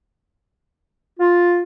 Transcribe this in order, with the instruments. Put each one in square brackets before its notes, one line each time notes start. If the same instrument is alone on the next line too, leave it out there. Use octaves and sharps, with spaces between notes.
[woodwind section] F4